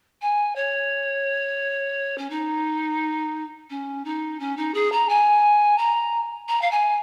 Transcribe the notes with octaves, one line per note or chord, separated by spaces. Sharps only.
G#5
C#5
C#4
D#4
C#4
D#4
C#4
D#4
G#4
A#5
G#5
A#5
A#5
F5
G#5